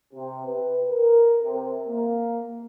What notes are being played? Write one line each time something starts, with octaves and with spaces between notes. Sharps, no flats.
C3
B4
A#4
C3
A#3